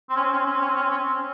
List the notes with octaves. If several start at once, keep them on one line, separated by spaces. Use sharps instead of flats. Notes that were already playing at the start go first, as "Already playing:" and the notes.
C4
C#4
C4
C#4
C4
C#4
C4
C#4
C4
C#4
C4
C#4
C4
C#4